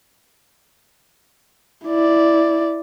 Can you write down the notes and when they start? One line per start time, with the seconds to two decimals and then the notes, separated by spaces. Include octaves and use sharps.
1.86 E4 D5